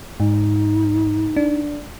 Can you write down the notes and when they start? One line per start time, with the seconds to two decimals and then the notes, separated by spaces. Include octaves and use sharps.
0.20 G#2 D#4
1.36 D4